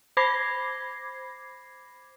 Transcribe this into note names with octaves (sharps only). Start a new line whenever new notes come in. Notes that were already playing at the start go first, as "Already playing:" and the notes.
C5 B5 D6 G#6 A#6 C7